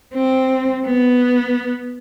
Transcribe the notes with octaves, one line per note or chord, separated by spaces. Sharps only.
C4
B3